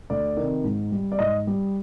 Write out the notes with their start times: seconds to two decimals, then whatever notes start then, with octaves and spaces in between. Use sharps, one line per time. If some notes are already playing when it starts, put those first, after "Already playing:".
0.10 D2 D5
0.37 C3 D#3
0.64 G#2
0.92 G3
1.12 D5
1.19 G#2 D#5
1.47 G3